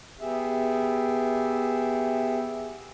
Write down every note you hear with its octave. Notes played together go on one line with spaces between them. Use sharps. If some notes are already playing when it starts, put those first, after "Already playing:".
B3 G4 G#4 E5